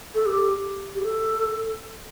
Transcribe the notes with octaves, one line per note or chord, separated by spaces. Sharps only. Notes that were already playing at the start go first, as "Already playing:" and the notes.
A4
G4
G4
A4